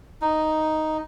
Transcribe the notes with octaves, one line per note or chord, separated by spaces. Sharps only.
D#4